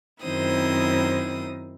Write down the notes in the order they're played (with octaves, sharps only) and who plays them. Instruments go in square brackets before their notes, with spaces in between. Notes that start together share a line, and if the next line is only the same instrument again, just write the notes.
[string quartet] F#2 D#3 C4 E4 C5 D#6